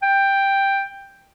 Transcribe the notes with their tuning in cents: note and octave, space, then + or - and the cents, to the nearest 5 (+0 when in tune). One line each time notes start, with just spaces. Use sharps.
G5 +5